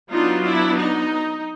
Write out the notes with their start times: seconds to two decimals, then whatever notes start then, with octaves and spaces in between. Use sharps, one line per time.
0.12 F#3 B3 D4 D#4 F4
0.44 D4 E4
0.76 D#4